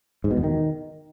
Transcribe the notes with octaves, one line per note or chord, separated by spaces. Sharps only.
G#2
B2
E2
D#3